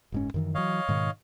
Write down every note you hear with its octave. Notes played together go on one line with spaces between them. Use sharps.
F#1 G#2 C#4
F#2 D#3 E3
E3 F#3 C#5 D#5 F5
G#2 B2 D#3